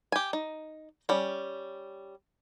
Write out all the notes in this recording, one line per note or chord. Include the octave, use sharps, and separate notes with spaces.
G4 G#5
D#4
G3 C#4